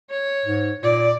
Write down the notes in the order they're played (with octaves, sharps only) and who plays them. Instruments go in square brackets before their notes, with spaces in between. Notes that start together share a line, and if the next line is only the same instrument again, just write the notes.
[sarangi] C#5
[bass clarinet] G#2
[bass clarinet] A#2 [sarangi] D5